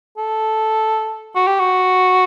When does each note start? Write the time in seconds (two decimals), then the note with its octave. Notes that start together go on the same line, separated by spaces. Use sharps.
0.18 A4
1.35 F#4
1.47 G4
1.60 F#4